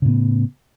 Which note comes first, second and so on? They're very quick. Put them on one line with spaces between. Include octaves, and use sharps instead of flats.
C#3 A2 B3